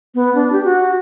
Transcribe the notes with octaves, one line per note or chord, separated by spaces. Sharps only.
B3
D4
G4
F#4